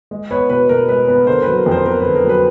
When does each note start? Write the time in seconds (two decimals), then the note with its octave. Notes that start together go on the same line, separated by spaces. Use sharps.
0.11 G#3
0.30 B3 B4 C#5
0.50 B2 B4
0.69 B2 A#4
0.88 G#3 B4
1.08 B3 B4
1.27 D3 A#4 C5
1.42 F#3 B4
1.57 A#4
1.66 F2
1.71 A#4 C5
1.86 B3 A#4
2.00 B4
2.05 D3
2.15 A#4
2.25 F#3 B4